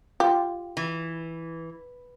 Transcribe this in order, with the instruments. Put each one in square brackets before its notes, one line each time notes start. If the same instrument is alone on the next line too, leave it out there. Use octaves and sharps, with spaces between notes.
[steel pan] F4 [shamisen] G4
[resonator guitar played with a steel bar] E3